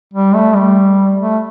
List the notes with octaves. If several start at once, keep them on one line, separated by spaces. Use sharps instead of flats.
G3
A3
G3
A3